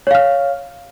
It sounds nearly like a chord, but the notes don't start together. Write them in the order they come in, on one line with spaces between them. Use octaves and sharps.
C#5 F5 F6